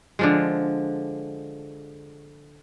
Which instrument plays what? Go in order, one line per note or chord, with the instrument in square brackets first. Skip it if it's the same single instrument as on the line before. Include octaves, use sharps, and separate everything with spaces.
[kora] D3 F3 G#3